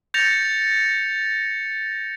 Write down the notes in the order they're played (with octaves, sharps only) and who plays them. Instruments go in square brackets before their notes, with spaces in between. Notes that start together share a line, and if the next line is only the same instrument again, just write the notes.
[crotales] G6 A6 A#6 C#7 F7